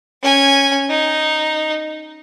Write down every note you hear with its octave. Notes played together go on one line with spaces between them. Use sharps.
C#4 G#5
D#4